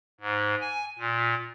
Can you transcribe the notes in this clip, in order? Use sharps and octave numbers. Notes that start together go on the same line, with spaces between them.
G#2
G#5
A#2